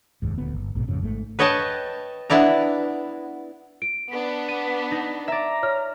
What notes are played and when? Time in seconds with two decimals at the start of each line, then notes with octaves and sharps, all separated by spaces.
0.22 F1 D#2 G#2
0.38 D#1 D2 B3
0.54 G1
0.75 A#1 G#2 B2
0.87 F2 G#2 C#3
1.01 G#1 G#2 C#3 A3
1.39 B4 C#5 D#5 G5 A5
2.30 B3 D4 E4 D5 A#5
3.82 D7
4.11 B3 D4 B6
4.49 D#7
4.91 D#4
5.28 D5 E5 A#5
5.63 C#5 F6